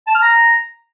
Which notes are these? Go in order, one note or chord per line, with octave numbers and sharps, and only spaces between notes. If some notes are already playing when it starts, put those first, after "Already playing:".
A5
F6
A#5